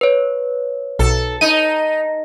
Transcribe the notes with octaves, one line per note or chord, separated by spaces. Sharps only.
B4 C#5
B1 A4
D#4 D#7